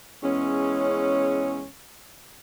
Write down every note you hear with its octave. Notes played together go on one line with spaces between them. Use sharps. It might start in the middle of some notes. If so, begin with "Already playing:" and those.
E2 G#3 C#4